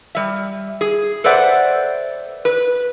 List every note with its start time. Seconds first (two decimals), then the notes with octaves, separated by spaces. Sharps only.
0.15 G3 E5
0.81 G#4
1.24 A4 B4 C5 D5 E5 F#5
2.45 B4